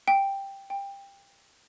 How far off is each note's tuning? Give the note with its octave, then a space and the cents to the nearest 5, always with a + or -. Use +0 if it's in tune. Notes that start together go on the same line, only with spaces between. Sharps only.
G5 +5
G5 +20